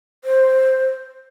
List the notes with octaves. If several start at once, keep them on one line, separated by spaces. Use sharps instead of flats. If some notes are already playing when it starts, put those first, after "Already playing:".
C5